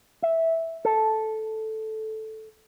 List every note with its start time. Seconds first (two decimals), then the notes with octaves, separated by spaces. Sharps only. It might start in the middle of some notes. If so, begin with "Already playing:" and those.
0.22 E5
0.85 A4